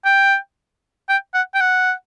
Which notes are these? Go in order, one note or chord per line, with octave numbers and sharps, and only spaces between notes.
G5
G5
F#5
G5
F#5